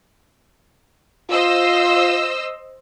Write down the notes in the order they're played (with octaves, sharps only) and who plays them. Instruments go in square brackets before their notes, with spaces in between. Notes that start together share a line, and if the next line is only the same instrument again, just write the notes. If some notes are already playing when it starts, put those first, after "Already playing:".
[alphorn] F4 [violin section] C5 D#5 E6